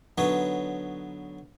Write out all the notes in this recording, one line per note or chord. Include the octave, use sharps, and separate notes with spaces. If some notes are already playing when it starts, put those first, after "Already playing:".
D3 F#3 B3 D#4 B4 C#5